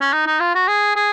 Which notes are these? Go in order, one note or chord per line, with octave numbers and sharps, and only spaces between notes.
C#4
D#4
D#4
F4
F#4
G#4
G#4